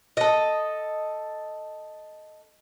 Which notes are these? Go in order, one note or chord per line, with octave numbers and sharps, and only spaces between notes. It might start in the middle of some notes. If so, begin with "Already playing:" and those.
A4 D#5